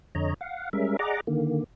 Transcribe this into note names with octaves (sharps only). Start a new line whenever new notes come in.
F2 D3 C#5 D#5 A#5
F5 F#5
G3 G#3 C#4 A#4 E5
G#4 D5 D#5 F#5 A#5 D6
D3 D#3 A#3